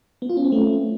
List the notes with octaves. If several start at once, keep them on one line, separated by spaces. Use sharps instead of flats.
B3
F4
C#4
C4
A3